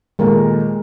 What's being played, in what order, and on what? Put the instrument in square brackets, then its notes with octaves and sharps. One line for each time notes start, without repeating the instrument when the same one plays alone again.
[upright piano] D#2 A#2 A3 [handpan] G#3 A#4